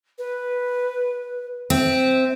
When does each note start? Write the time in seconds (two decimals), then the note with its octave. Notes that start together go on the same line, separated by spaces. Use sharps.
0.18 B4
1.70 C4 E5